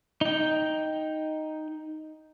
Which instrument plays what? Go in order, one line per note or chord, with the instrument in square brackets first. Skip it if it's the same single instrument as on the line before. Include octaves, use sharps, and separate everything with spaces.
[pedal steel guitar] D#4 G5